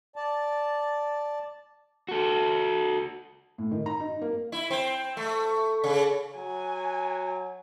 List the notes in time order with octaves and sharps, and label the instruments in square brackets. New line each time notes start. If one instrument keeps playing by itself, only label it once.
[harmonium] D5 A5
[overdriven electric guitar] F#4 A4
[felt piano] A2
D#3
A#5
D#4
A#3
[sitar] E4
C4
A3
C#3
[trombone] F#3 [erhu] G#5